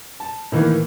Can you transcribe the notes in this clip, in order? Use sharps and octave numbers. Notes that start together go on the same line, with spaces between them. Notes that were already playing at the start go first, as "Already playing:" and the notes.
A5
A2 D#3 E3 A#3